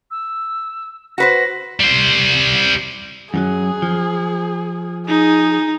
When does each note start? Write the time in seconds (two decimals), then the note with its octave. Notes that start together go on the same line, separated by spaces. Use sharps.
0.11 E6
1.18 F#4 B4 C5 A#6
1.80 G3 C5
3.34 F#2 E3 F#3 G#4
3.82 F3
5.08 D#4 G#4